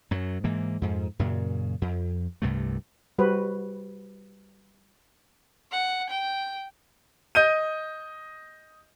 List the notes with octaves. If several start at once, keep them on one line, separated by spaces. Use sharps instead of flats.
F#2 F#3
G#2 E3 A#3
F2 G#2
F#2 A#2 C#3
F2
C2 G2 C3 A3
G3 F#4 B4 C5
F#5
G5
D#5 G6 D#7